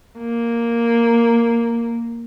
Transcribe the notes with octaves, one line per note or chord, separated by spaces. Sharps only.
A#3